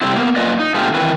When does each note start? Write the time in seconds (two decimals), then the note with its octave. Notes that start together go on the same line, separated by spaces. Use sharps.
0.01 C3 G3 A3 C4 E4
0.16 A#3 B3
0.36 F#2 A#3 F4 B4 D5 D#5
0.59 D#4
0.74 B2 D3 G#3 A3 F4 G4
0.94 D#3 E3 C4 E4 B4